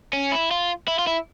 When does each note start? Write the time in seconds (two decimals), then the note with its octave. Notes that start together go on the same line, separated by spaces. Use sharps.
0.13 C#4
0.32 E4
0.51 F4
0.88 E4
0.99 F4
1.07 E4